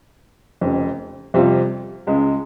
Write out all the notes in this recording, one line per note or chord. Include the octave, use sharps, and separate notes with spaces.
F1 F2 C#3
F2 C3 G3 C4 F4
C#2 C#3 G#3